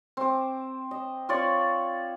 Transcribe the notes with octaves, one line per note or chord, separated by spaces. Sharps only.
C4 D6
D#5
C4 F4 C#5 D5